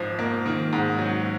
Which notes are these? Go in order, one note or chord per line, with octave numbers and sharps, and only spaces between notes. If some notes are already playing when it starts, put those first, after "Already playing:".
Already playing: G#1 G#2 F3
A#3
D#3
G#2
F#3